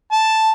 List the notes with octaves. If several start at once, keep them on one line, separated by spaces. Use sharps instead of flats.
A5